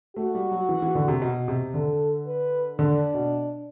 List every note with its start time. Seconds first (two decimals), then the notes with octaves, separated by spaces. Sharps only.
0.16 A3 F#4
0.35 G3
0.51 F#3
0.69 E3
0.82 E3
0.95 D3
1.08 C3
1.22 B2
1.48 C3
1.74 D3 A4
2.27 B4
2.79 D3 D4
3.14 B2